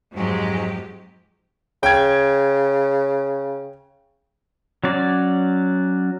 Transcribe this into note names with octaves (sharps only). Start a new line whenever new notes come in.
F2 G#2 F#3 G#3 G4
C#3 G5 G#6
F#3 C#4 D5